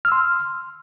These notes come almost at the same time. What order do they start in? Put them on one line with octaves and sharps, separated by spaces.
F6 E6 C6